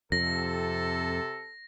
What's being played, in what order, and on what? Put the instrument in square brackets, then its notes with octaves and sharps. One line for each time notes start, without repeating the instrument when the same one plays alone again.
[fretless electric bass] F2 [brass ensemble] C3 A4 [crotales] A#6